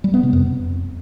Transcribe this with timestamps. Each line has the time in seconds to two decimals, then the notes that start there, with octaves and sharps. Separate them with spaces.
0.04 G3
0.14 B3
0.23 C3
0.33 F2